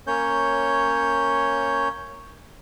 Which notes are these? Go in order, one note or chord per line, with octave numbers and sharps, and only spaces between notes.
A#3 C#4 C#5 G6